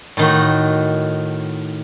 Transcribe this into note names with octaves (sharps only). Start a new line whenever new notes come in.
A2 D#3 F#4